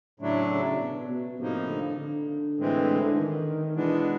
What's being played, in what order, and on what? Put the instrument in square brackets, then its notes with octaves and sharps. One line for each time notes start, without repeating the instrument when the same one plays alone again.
[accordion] A2 F#3 A3 D4 [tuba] C#3
[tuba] C#3
B2
B2
[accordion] A2 F3 A#3 D#4 [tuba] C3
[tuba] D3
D3
[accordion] A2 E3 G#3 C4
[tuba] D#3
[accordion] B2 G#3 B3 D4 [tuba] E3